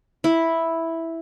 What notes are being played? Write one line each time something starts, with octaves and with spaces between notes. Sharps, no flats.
E4